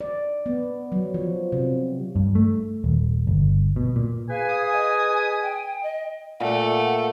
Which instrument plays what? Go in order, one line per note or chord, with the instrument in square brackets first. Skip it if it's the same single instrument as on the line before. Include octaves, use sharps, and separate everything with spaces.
[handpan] D5
B3
F#3
F3
C3
[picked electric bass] G2
A3
D#1
G1
B2
A#2
[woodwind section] G#4 B4 G#5 [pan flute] F5
[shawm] D#6
[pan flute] D#5
G5
D#5
[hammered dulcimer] A#2 [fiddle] A3 [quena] F#5